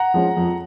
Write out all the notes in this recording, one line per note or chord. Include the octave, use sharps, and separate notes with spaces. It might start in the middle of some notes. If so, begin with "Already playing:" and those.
Already playing: F#5 A#5
F3 G#3 C#4
F2